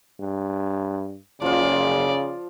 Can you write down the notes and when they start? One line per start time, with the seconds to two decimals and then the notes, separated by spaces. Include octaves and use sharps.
0.20 G2
1.42 F#1 C#3 F3 F4 D5